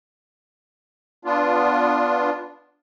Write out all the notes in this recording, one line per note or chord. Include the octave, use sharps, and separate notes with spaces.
B3 D4 F4